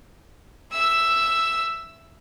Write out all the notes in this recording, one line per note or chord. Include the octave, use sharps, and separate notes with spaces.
E5 E6